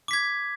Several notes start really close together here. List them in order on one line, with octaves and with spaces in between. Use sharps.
D6 B6 G#6